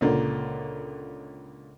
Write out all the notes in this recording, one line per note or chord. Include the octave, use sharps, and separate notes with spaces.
C#2 A#2 D3